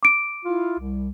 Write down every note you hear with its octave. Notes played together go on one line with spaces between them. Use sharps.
D6 D7
E4 F4
C2